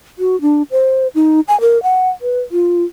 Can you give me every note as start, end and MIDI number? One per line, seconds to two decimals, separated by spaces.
0.19 0.40 66
0.41 0.63 62
0.71 1.08 72
1.15 1.40 63
1.48 1.59 80
1.61 1.81 70
1.83 2.09 78
2.22 2.41 71
2.52 2.84 65